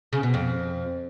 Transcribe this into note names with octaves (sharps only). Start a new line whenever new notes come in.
C#3
B2
F2